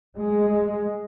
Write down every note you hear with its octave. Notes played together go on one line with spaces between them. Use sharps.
G#3